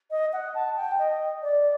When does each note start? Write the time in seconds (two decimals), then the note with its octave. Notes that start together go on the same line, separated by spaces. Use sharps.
0.11 D#5
0.33 F#5
0.55 A5
0.76 G5
0.99 D#5
1.42 D5